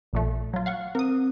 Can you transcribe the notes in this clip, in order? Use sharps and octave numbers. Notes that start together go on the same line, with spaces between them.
A#1 A#2 A3
F#3 F4
F5 F#5 C#6
C4 A#4 D#6